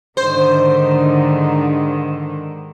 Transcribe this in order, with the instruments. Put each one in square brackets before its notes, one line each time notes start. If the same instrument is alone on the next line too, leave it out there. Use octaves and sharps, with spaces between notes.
[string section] G#2 D3 D#3 [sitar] C5